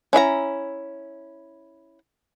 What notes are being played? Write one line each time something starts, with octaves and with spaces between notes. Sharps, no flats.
C#4 E4 E5 A#5